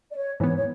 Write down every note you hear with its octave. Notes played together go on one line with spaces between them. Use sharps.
D5
C#5
G#2 E3 B3 C#5
C#5